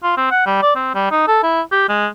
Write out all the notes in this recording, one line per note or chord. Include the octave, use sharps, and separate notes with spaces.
F4
C4
F#5
G3
D5
C4
G3
D#4
A4
E4
G4
G#3